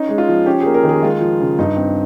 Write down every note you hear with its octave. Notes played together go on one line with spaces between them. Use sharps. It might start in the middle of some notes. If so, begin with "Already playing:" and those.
Already playing: C#4 D#4
G#3
F4
F3
C#4 G4
G#4
A#3
A#4
D#3
G#4
G#3 F4
F3
C#3
G2 D#4
C4